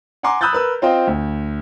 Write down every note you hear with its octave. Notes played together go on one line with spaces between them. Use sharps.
F#5 G#5 A#5 C6 D6
B5 D#6 E6 F#6 G6 A6
A#4 B4 E6
C4 F4 C5 D#5 G5
D2